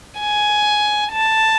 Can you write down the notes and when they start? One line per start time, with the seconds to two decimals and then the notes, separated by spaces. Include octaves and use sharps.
0.20 G#5
1.13 A5